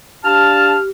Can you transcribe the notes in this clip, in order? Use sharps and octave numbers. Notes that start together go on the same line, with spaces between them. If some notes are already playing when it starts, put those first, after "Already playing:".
D4 G4 F5 A5 F6